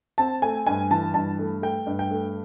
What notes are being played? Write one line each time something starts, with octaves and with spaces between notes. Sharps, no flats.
C4 A5
A3 G#5
G2 G#5
E3 A5
G2 A5
A3
A3 G5
G2
G5
A3